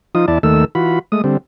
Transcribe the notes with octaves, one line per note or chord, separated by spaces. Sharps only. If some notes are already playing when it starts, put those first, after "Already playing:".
F3 D#4 F4 D#6
E2 E4 D5 A5
D#2 D#3 A3 A4 E6
E3 F4 F#4 B5
G#3 A3 D#6
D3 G3 C4